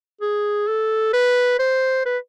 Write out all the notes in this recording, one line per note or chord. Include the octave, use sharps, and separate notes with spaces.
G#4
A4
B4
C5
B4